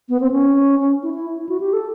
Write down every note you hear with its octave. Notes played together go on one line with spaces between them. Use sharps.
B3
C4
C#4
C#4
E4
E4
E4
F#4
G4
A4